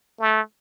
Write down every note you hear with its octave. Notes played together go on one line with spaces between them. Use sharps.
A3